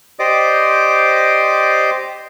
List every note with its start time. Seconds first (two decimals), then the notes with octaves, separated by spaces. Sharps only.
0.19 G4 C5 D5 D#5 D6